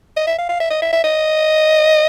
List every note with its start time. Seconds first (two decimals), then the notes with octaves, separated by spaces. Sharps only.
0.17 D#5
0.27 E5
0.39 F5
0.49 F5
0.60 E5
0.71 D#5
0.82 E5
0.93 E5
1.04 D#5